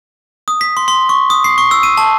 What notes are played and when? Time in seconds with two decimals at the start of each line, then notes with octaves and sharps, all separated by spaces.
0.48 D#6
0.61 B6
0.77 C6
0.88 C6
1.09 C#6
1.30 D#6
1.44 C7
1.58 C#6
1.71 E6
1.83 D#7
1.97 A5